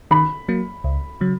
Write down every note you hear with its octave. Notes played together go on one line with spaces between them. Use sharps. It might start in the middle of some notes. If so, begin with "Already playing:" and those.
D#3 B5
F#3 A#3
C#2
C#3 F#3